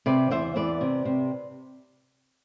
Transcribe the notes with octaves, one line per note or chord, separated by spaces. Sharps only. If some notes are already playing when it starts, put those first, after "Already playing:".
C3 B4 D5
E2 C5 E5
E2 B4 D5
C3
C3